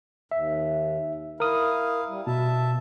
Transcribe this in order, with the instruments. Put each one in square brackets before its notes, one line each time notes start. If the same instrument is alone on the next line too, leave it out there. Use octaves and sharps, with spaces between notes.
[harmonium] D#2 [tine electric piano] E5
[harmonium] E4 F5 [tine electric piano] A#4 D#6
[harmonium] G3
[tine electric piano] B2 [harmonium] E5 A5